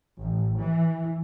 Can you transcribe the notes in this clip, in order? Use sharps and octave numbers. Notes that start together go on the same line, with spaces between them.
A1
E3